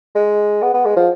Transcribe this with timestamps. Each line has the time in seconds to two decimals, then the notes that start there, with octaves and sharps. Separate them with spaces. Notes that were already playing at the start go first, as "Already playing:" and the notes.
0.15 G#3
0.63 B3
0.74 B3
0.85 G#3
0.96 F3